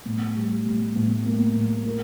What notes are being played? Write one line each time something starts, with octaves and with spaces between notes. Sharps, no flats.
A2
G3
A2
A2
A#3
A2
A#4